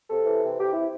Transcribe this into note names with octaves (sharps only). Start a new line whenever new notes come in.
C3 A4
E3
C3
C3 G4
C3 E4